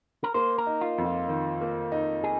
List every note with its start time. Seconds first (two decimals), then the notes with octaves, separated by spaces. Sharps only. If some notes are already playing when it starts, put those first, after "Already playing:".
0.24 A#4
0.34 A#3 C5
0.58 A#4
0.67 D#4
0.81 F4
0.98 F2
1.05 F4
1.28 D#3
1.61 A#3
1.92 D#4
2.24 G#4